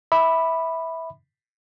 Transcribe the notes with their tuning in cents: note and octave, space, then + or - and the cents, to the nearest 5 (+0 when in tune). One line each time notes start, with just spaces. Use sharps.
E5 -15 B5 +0 D6 +30